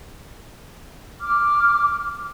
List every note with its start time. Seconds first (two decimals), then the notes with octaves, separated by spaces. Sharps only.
1.21 D6 F6